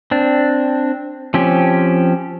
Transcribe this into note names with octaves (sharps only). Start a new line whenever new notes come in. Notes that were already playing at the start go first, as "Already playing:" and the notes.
C4 D4
F3 C4 C#4 G4